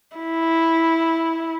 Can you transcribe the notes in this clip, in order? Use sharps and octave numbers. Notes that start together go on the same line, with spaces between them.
E4